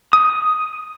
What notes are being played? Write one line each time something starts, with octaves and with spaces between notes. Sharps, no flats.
D#6